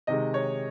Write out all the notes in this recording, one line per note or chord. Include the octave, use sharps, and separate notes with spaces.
C3 D#3 G#3 D#5
C#5